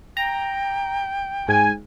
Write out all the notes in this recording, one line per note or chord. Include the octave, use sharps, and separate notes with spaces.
G5 A#5
G#2 G#5